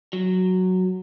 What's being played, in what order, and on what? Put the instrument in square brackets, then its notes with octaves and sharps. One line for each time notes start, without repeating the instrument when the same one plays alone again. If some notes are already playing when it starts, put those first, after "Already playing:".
[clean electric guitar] F#3